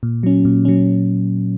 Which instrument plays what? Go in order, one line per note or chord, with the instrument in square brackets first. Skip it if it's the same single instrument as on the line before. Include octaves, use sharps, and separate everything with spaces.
[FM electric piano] A#2
F#3 C#4
A#2
F#3 C#4